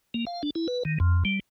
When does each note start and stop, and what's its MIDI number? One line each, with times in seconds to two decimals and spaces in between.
0.14 0.25 58
0.27 0.42 77
0.43 0.50 62
0.55 0.67 64
0.68 0.83 71
0.85 0.98 51
1.00 1.24 41
1.25 1.40 55